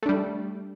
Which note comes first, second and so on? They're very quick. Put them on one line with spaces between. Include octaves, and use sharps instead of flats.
A3 D4 G3